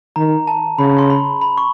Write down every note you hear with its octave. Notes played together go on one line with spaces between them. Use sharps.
D#3 A#5
A5
C#3 B5
C6
B5
B5
C#6